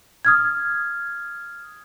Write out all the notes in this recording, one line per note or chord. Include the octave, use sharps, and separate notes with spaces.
D#6 F6 G#6